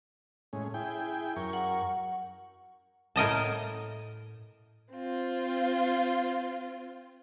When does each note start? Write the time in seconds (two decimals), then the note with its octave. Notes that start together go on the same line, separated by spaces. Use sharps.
0.53 A2 G#3 C#4
0.74 E4 G#4 G5
1.36 F#2 A#4 C#6
1.53 F#5
3.16 A2 A#4 D#5 A5
4.92 C4 F4